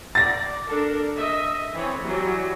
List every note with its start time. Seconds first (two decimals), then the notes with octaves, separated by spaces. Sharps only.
0.15 D5 A6 A#6
0.69 D4 A4 A#4
1.16 D#5 E5
1.74 E3 C4 C#5
2.02 E3 F#3 G3